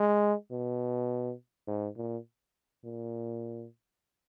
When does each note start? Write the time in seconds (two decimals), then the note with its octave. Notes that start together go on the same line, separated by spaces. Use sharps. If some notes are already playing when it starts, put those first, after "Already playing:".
Already playing: G#3
0.51 B2
1.67 G#2
1.97 A#2
2.84 A#2